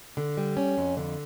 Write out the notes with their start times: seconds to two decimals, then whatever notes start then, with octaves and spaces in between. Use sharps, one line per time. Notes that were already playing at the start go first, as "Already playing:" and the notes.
0.17 D3
0.37 G3
0.57 C#4
0.78 F2
0.97 D3